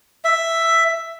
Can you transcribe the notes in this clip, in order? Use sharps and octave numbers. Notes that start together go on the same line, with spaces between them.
E5